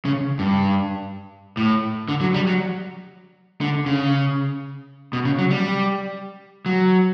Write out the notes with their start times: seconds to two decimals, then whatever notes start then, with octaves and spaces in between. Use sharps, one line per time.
0.05 C#3
0.39 G2
1.57 A2
2.08 D3
2.21 F#3
2.34 G3
2.47 F#3
3.61 D3
3.86 C#3
5.13 B2
5.25 C#3
5.39 F#3
5.51 G3
6.66 F#3